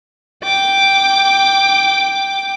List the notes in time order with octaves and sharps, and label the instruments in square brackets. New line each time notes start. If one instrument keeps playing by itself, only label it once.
[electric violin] G5 D6